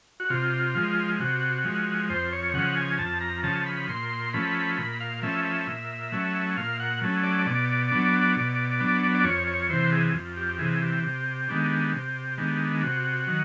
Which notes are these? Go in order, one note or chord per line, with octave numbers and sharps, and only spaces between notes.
F#4
C3 F4
F3 G#3
C3 F#4
F3 G#3
F2 C5
C#5
C#3 F3 F#5
G#5
F2 A5
A#5
C#3 F3 A5
B5
A#2 C6
F3 A3 C#4 B5
A#2 B5
F5
F3 A3 C#4 E5
E5
A#2
F#3 A3 C#4
A#2 F5
F#5
F#3 A3 C#4
D5
B2 D5
F#3 B3 D4
B2
F#3 B3 D4
D5
F2 C#5
C#5
C3 E3 C5
G#4
F2
G4
C3 E3 G#4
G4
C3
D#3 G#3 B3 D4
C3
D#3 G#3 B3 D4
C3 F#4
D#3 F#3